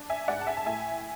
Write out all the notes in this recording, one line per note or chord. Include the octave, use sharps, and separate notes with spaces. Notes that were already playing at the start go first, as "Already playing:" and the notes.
Already playing: D4
E5 G#5
G#2 D5 F#5
A5
E5 G#5
A5
A2 E5 G#5